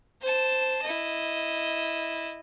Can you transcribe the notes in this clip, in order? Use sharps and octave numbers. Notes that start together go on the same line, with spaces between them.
C5 A5
E4 D#5